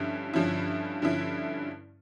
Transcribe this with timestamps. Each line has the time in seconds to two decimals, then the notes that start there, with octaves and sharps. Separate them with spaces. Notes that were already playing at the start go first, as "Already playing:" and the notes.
Already playing: G2 D3 F3 C#4 E4
0.34 G2 D3 F3 C#4 E4
1.02 G2 D3 F3 C#4 E4